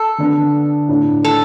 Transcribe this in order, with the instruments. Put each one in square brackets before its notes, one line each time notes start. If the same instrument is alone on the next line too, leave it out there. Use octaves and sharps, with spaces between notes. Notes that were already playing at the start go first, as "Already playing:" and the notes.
Already playing: [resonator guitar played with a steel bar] A4
[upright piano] D3 B3 D4 B4
A2 A3 D4
[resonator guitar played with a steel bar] A4